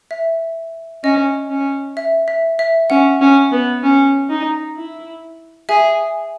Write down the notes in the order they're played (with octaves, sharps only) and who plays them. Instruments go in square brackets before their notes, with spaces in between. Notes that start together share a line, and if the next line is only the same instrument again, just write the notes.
[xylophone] E5
[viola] C#4 [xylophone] D#5
[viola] C#4
[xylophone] E5
E5
E5
[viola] C#4 [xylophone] F#5
[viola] C#4
B3
C#4
D#4
E4
[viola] G#4 [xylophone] E5 G#5